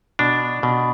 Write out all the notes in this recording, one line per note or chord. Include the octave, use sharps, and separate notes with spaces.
B2 D4
B2